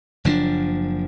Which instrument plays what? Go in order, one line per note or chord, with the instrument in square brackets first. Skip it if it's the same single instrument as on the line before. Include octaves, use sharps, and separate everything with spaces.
[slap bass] F#1 F3 C4 D4